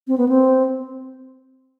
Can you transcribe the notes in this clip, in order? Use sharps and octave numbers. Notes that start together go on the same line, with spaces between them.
C4
B3
C4